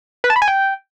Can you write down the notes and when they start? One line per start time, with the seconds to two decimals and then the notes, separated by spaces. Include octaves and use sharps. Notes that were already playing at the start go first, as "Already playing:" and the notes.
0.24 B4
0.30 A5
0.36 B5
0.42 G#5
0.48 G5